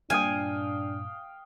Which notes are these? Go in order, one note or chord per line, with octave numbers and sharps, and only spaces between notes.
G2 A#2 D4 F5 G5 G#5 D#6